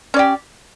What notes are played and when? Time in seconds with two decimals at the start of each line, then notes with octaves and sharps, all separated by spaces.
0.14 C#4
0.16 D5
0.19 G4